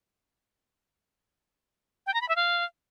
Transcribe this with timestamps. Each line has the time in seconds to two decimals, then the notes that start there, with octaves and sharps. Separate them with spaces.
2.06 G5
2.14 A#5
2.21 B5
2.29 E5
2.36 F5